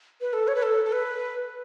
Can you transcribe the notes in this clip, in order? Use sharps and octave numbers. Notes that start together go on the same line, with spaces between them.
B4
A4
C#5
B4
A4
A4
B4